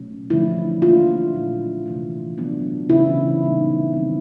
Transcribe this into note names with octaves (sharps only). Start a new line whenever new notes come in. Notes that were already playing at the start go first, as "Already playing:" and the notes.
Already playing: B2 F#3 A3 C#4
D3 F3 A3 D4 E4
F3 A#3 D4 F4
A#2 F#3 A#3
C3 E3 A3
F#3 B3 D4
C#3 E3 A3 C#4 E4
A#2 G3 B3 D#4
D#3 G3 C4